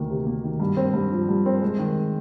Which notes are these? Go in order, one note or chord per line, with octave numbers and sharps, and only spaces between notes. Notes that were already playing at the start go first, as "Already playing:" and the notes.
Already playing: D2 D#3 A#3
C3
A#3
D#3
G2
C4
G2
F3
G2
C4
G#3
D#3